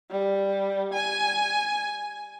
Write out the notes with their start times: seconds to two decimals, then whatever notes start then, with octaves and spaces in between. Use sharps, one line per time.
0.11 G3
0.93 G#5